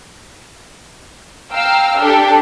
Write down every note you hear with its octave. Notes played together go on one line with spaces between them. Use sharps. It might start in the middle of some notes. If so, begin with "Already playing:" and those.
F5 G5 A#5 E6 F6
D4 G4 A4